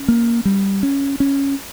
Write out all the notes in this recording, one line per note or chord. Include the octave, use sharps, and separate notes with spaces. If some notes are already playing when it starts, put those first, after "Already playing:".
Already playing: C#4
A#3
G3
C#4
C#4